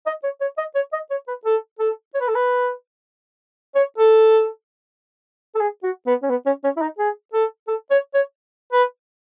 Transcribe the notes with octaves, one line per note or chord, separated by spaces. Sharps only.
D#5
C#5
C#5
D#5
C#5
D#5
C#5
B4
A4
A4
C#5
B4
A4
B4
C#5
A4
A4
G#4
F#4
B3
C#4
B3
C#4
C#4
E4
D#4
G#4
A4
A4
C#5
C#5
B4